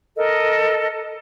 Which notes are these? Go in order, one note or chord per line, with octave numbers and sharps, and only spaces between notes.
A4 A#4 D#5